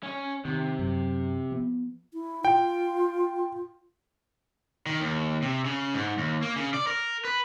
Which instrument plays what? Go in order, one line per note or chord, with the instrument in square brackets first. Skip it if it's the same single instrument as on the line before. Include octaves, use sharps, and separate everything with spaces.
[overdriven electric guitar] C#4 C#5
[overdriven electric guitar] C3 [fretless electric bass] D#3
[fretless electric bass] F#2 F#3
F3 B3
[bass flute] E4
[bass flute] F4 [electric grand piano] G5
[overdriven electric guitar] D#3
D#2
C3
C#3
G#2
D#2
A#3
C#3
D5
A#4
B4